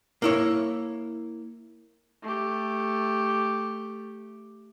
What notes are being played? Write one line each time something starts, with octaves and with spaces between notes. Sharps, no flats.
A#3 E4 C#5
A3 G4